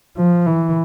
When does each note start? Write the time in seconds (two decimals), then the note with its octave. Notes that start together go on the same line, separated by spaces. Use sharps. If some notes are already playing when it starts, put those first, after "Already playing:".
0.17 F3
0.47 E3